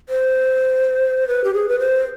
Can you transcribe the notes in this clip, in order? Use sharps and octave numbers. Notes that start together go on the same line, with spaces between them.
C5
B4
G4
G#4
B4
C5